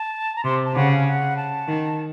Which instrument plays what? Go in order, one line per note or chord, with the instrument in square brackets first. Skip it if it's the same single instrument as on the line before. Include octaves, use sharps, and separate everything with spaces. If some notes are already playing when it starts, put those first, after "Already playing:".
Already playing: [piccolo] A5
A#5
[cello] C3 [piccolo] C6
[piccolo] A5
[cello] C#3 [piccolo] F#5
[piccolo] F5
F#5
A5
[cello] D#3